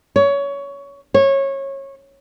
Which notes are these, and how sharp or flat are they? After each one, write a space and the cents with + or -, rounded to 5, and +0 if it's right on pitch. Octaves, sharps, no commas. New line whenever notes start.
C#5 +20
C#5 -20